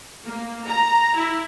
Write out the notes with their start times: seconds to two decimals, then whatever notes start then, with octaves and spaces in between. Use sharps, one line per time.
0.24 A#3
0.65 A#5
1.15 E4